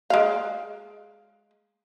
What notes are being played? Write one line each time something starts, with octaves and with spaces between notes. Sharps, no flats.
G#3 F5